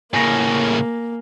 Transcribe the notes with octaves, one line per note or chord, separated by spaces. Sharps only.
A2 C#3 A#3 G#5 A#6